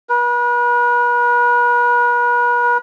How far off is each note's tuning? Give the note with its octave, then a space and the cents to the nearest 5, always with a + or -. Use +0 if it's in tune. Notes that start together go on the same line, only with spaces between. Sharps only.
B4 -40